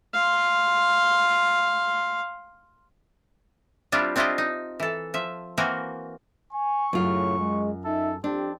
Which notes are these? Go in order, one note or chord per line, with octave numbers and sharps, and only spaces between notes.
F5 C6
G3 C4 D4 E4 F4 G4
C4 D4 E4 F4 G4 D#5
D#4
E3 A4
F3 E5
E3 A#3 C4 F#4 A#4 G#5
G#5 C#6
F#2 A2 C#3 F4
G#3
D#4 A4 E5
F2 C4 D4 G4